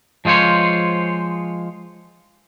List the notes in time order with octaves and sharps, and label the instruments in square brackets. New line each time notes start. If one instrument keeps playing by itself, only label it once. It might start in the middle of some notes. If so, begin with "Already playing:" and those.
[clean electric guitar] F3 G#3 F4 C5 C#5